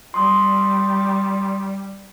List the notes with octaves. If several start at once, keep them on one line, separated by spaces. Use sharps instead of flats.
G3 C6 D#6